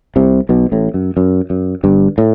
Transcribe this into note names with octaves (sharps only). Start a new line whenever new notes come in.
C2 C3
B1 B2
A1 A2
F#2
F#2
F#2
G1 G2
A2